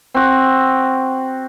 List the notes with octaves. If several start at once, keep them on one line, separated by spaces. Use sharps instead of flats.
C4 F#4